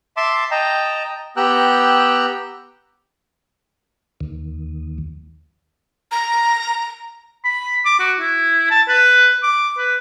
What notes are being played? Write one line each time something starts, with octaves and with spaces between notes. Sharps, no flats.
E5 A5 C6 D6
D#5 G5 A5 A#5
B3 G4 G5 A#5 E6 F#6
D#2
A#5
B5
D6
F#4
E4
A5
B4
D6
B4